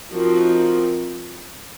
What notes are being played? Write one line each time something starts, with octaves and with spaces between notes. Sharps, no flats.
F3 C4 D#4 F#4 A#4